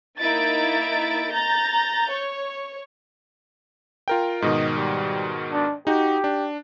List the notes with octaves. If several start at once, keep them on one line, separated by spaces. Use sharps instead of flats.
A#3 D#4 E4 A6 D7
A#5 G6 A6
C#5
F4 A#4 G5
G#2 B2 D#3 D#5
G3
D4
D#4 F#4 G4
D4